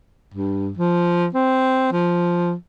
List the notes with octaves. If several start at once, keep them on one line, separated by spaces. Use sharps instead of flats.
G2
F3
C4
F3